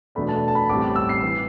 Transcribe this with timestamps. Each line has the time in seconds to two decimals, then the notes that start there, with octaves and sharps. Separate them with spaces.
0.15 E2 B2 A3 D4 B5
0.29 A5
0.48 A5
0.55 B5
0.69 A1 A2 G3 C4 D6
0.96 E6
1.09 C7
1.23 E3